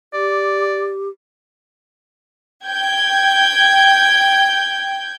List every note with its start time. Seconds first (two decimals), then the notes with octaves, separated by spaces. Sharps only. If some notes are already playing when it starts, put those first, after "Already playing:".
0.14 G4 D5
2.67 G5 G6 G#6